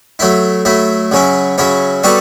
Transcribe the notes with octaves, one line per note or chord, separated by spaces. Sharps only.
F#3 A3 E4
F#3 A3 E4
C#3 F#3 C#4 E4
C#3 F#3 C#4 E4
G3 B3 F#4 A4 C#5